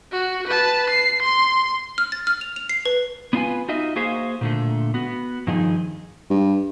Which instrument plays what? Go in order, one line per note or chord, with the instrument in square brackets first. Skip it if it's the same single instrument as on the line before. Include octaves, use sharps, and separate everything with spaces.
[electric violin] F#4
B4 A5
C7
C6
[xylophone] F6
A6
F6
F7
F7
C7
B4
[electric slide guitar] B3 C#4 F4 A4 B4 G#5
D#4 F4 F#4 D#5 E5
A#3 F#4 G#4 C5 E5 F5
A#2 D3 A3
B3 F#4
G2 D#3 F3 D#4 G#4
[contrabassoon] G2